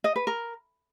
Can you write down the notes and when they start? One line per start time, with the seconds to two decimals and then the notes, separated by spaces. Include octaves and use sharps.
0.04 D#5
0.16 B4
0.27 A#4